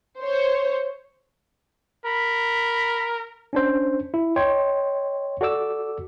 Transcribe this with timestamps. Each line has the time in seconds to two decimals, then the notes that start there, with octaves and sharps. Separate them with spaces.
0.20 C5 C#5
2.05 A#4 B5
3.53 C#4 D4 C5
4.14 E4
4.36 C#5 D#5 G5 C6
5.41 F#4 A4 D5 D6 E6